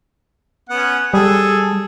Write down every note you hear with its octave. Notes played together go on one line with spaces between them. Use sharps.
B3 C#4 F#5
G3 G#4 A4